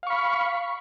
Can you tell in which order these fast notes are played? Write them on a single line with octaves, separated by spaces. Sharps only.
F5 C#6 B5